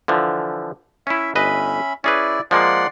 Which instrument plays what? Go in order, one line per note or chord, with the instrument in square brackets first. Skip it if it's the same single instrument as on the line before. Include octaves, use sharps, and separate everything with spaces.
[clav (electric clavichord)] D3 E3 F3
[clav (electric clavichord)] C#4 E4 [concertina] E5
[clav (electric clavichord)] G1 B4 D#5 [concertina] C#4 E5 B5
[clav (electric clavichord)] C#4 G#4 B4 [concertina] E4 D5
[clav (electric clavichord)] F3 G#3 A#3 [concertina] D5 F#5 C6